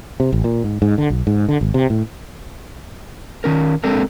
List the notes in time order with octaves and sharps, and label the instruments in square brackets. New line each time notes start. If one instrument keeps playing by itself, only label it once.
[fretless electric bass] C3
A1
A#2
G#2
G#2
D3
B1
G#2
D3
G#1
C3
A2
[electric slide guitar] D#3 C#4 A#4
G#3 C4 D4 A4 A#4